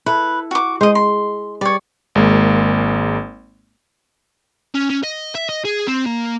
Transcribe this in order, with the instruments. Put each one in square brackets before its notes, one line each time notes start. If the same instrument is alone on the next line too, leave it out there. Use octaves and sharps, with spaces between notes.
[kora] E4 A4 [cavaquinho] B4
[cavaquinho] F#4 D6
[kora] G#3 [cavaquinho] C5 D#5
[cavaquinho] C6
[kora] G3 [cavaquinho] C#5 D5
[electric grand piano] G#1 G#3 A#3
[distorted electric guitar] C#4
C#4
D#5
E5
D#5
G#4
C4
A#3